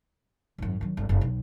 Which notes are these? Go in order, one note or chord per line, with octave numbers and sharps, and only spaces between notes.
G#1 F#2
D#3 F#3
G1
F#1
B1